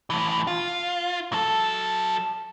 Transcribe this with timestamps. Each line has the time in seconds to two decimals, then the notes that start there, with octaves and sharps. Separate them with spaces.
0.10 A2 E3
0.47 F4
1.33 F#3 A4